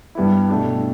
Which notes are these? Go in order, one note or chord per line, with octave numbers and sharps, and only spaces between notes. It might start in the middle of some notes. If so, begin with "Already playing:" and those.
G2 G3 B3 E4
B2 A3 D4 G4